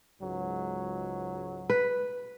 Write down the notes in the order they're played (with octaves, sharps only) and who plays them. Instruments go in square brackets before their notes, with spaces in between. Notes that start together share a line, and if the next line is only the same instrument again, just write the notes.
[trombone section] C#2 G#2 F#3
[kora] B4